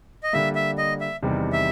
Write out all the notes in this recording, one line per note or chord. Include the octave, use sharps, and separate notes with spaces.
D#5
D3 G3 A#3 E5
E5
D#5
E5
E2 C3 D#3 G3 C4
E5